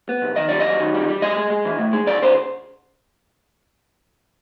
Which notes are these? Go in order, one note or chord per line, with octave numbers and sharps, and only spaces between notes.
B3
C2
D#3 D#5
G3 D5
D#5
F#2
D#3
G3
G3
G#3 D#5
G#3
G#3
E3
A2
G#3
C#2 D5
C#2 C5